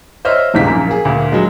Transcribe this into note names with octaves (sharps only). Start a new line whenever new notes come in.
C5 C#5 D#5 E5 F6
D#1 C#2 G#2 B6
A#1 F#2
A#3 G#4
D2 A#2 D3
F#3 G#3